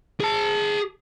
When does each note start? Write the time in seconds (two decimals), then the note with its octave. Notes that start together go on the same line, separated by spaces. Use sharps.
0.20 G#4 A5